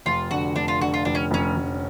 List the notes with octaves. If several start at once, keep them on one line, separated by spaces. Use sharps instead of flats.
F1 F4
D3 F#4
F1 D4
F4
D3 F#4
F4
F1 D4
C#4
F1 C#4
F1